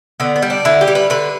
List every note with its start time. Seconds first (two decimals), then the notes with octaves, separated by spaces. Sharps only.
0.20 D3 B3
0.36 B3
0.42 G3
0.50 D4
0.65 D3 E4
0.81 G4
0.88 G3
0.95 B4
1.10 D3 B4